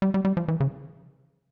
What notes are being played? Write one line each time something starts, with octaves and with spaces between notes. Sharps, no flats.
G3
G3
G3
F3
E3
C#3